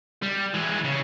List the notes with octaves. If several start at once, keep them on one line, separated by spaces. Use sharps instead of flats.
G3
E3 G#3
C#3